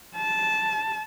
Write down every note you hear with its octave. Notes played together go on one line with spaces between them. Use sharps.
A5